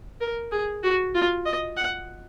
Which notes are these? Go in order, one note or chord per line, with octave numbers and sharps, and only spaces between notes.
A#4
G#4
F#4
F4
D#5
F#5